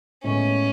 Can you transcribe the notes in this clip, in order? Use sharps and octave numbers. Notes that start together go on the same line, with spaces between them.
A2 G#3 B3 C#4